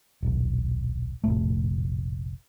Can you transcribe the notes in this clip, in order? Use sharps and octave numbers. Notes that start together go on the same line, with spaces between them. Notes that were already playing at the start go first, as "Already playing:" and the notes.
D#1 B1
F1 A#1 A2 A3